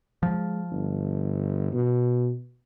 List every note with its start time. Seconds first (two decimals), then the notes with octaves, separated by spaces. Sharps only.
0.23 F3 G#3
0.71 G1
1.73 B2